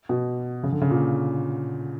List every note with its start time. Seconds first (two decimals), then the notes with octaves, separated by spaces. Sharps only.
0.09 B2
0.63 C#3
0.72 D3
0.81 C#3
0.90 A#2